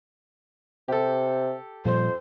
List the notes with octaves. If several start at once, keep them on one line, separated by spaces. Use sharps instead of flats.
C3 G4 A4
F2 A#2 F3 G3 C5